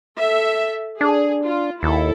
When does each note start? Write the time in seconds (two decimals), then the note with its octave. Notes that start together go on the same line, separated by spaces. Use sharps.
0.17 A4 E5
1.01 D4 G#4
1.45 F4
1.83 D#2 E4 A4